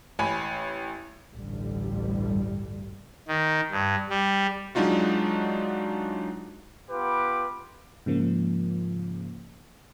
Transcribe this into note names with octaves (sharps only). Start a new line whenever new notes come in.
A1 G#5 B5
A1 D2 G2 D3 G3
D#3
G2
G3
F#3 G#3 D4 D#4 F4 F#4
B3 F4 G4 B4 D6
G#2 C#3 F3 A#3